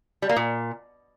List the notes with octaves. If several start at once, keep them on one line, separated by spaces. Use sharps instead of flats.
G3
A#3
A#2